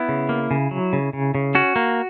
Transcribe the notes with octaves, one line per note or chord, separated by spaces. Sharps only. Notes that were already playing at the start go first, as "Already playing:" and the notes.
Already playing: B3 E4
C#3
A#3
C#3
F#3
C#3
C#3
C#3
C#4 F#4
A#3